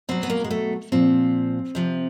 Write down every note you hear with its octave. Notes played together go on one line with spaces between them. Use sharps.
B2 F#3 C4
B3
A#3
G#3
A3
A#2 F3 C4
C3 F3